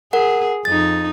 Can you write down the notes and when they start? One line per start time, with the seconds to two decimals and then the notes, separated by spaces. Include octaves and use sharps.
0.13 G#4 A#4 F#5
0.65 F2 D#4 A6